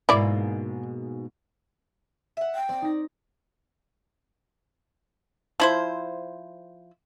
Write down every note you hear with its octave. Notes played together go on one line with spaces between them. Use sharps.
G#2 B2 A#3 E4 D5
E5 F#5
G5
C4 D5
D#4 A#6
F3 E4 C5